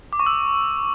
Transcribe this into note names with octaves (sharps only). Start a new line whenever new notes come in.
D6
C#6
E6